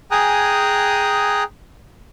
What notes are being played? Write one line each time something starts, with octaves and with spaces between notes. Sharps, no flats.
G#4 G5 G#5 A#5 D#6 F#6